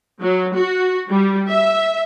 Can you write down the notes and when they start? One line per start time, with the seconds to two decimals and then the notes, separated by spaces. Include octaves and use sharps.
0.21 F#3
0.55 F#4
1.10 G3
1.48 E5